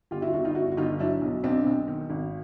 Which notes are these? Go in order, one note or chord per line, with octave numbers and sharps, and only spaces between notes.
G1 F4 G4
E4 F#4
F4
G1 E4 F#4
D#4 F4
G1 E4 F#4
F#4
G1 D#4 F4
F#3 D4 E4
B1
B1 C4 D4
B1
D#3
G#1